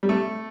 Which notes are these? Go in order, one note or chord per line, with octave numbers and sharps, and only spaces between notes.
G3
A3